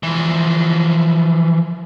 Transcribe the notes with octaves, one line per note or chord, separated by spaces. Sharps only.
E3 F3